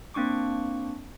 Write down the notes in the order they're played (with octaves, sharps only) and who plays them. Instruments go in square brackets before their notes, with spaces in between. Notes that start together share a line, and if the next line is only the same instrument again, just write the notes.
[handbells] A#3 C4 D4 C#6 D6